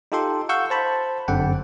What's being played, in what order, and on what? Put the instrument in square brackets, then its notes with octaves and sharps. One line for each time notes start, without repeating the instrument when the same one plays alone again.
[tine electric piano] D#4 F4 G4 A4 G5 C6
F5 F#5 C#6 E6 G6
C5 A5 B5
G1 F#2 D3 C4 F#5 G5